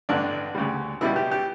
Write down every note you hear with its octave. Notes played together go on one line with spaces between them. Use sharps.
A1 G2 D3 D4
D2 C#3 G3
C#2 B2 G3 E4
G4
G4